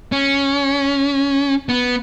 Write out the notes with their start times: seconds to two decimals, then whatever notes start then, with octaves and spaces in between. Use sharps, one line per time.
0.12 C#4
1.69 B3